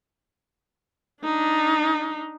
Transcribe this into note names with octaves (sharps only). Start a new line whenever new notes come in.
D4 D#4